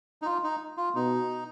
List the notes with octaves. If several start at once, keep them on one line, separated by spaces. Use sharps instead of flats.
D#4
F4
D#4
F4
B2 D#4